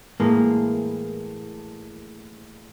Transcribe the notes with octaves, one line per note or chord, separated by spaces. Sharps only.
A2 E3 G#3 A#3